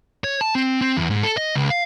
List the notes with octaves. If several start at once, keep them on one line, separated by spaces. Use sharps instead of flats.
C#5
A5
C4
C4
E2
G#2
A4
D#5
C#2
F5